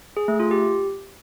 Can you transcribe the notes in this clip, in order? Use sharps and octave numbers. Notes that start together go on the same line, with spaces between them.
G#4
A3
F4
G4